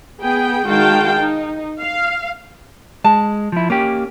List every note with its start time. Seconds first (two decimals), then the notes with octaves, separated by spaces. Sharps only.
0.21 B3 G#4 G5
0.68 D#3 G#3 F#4 F5 G5 A5
1.19 D#4
1.80 F5
3.04 G#3 A5
3.52 F3 E4
3.70 A#3 C#4 G4